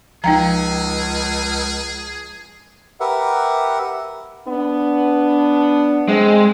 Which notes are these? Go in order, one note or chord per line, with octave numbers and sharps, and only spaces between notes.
C#2 F3 D#4 G#4 G5 A#5
G4 A#4 B4 E5 F#5
B3 D4
G#3 C4